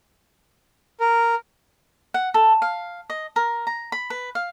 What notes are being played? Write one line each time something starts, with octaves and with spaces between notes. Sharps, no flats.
A#4
F#5
A4
F5
D#5
A#4
A#5
B5
B4
F5